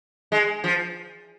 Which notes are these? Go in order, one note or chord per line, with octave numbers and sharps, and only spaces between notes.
G#3
F3